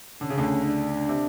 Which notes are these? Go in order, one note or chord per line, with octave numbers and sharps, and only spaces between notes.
D3 C#4
C#3
D2 D3
D4
C3